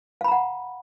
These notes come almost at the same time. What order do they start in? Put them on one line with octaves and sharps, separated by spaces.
F5 B5 A#5 F#5